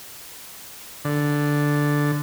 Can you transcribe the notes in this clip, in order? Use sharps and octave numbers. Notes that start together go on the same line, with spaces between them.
D3